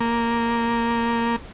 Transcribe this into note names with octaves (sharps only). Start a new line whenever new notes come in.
A#3